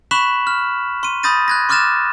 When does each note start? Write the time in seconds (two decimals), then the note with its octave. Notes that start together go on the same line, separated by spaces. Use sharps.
0.11 B5 C#6 F#6 B6 E7 F#7
0.47 F6
1.03 C6 D#7
1.23 B5 D#6 G6 A6 A#6 D#7
1.48 F#6 G#6 A#6
1.69 C6 D6 F6 F#6 A6 E7